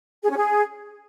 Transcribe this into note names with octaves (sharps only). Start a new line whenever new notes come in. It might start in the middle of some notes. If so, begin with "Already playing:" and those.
G#4
C#4
G#4